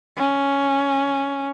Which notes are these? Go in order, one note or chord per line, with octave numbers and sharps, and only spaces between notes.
C#4